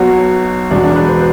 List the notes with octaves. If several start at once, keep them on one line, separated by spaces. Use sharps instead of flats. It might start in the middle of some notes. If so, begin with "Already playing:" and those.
Already playing: B1 B2 F#3 F#4
E1 E2 B2 F#3 D4
D4
B4
C5